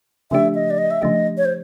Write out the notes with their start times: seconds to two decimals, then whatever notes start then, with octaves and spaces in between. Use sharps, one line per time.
0.31 C#3 F3 A3 D4 G4 E5
0.55 D#5
0.70 D5
0.78 D#5
0.91 E5
1.02 C#3 F3 A3 D4 G4 D#5
1.38 C#5
1.45 C5